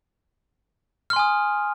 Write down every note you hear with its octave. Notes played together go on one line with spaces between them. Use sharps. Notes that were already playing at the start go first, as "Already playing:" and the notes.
G#5 C6 D#6 F6